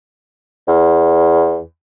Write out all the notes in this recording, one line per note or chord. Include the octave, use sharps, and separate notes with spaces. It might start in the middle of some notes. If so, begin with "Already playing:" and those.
E2